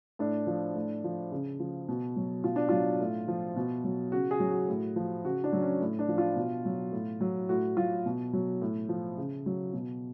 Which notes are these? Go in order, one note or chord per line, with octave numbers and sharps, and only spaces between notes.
A2 D4
F3
A2
F3
C#3
F3
B2
F#3
B2 F4
D4
F#3 F4
A2
F3
B2
F#3
C#3 F#4
G#4
F#3
F#4
A2
F3
C#3 F#4
D4
F#3
C#4
A2
D4
F3
F4
B2
F#3
A2
F#3
A2 F#4
F#3 F4
B2
F#3
A2
F3
C#3
F#3
B2